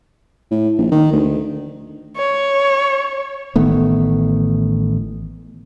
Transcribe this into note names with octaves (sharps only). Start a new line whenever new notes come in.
A2
A#1
D#3
D2
C#5
A1 D#3 A3 B3